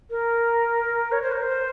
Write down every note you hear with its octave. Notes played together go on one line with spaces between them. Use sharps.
A#4
C#5
C5
A#4
C5